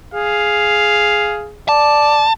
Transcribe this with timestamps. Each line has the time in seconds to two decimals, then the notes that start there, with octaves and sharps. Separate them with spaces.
0.14 G#4 F5
1.69 D5 A5